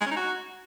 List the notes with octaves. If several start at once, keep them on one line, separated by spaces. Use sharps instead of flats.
G#3
C#4
D#4
F#4